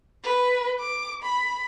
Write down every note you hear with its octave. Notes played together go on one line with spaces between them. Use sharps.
B4
D6
B5